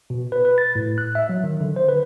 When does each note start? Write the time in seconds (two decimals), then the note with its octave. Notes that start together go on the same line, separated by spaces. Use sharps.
0.10 B2
0.32 B4
0.45 B4
0.58 A6
0.75 A2
0.98 F#6
1.15 E5
1.29 F#3
1.44 D#3
1.61 D3
1.76 C5
1.89 B4